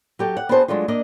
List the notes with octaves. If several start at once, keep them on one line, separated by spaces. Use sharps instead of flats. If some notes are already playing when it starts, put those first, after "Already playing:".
F#3 G4 A4
F#5
B3 D4 F#4 G#4 C5 A5
F#3 G#3 A3 D4 F4
A#3 D4 D5 D#5